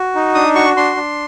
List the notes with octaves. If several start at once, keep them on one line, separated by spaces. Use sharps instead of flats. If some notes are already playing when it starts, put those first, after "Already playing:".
Already playing: F#4
D#4
D4 D#6
F#4 C#6
D4 C6
D4